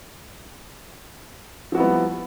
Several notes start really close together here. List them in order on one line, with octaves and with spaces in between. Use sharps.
F3 F#4 E4 B3 G3